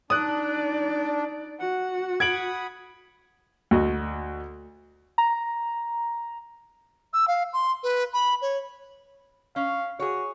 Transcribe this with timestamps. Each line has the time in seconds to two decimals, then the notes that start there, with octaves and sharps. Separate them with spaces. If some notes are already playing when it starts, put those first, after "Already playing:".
0.10 D4 D#4 D5 D#6 F#6
1.59 F#4 F#5
2.20 F#5 B5 D#6 G#6 D7 F#7
3.71 D2 F#4 D#5
5.18 A#5
7.13 E6
7.28 F5
7.53 C6
7.83 B4
8.13 B5
8.42 C#5
9.56 C#4 F5
9.99 F#4 G#4 C#5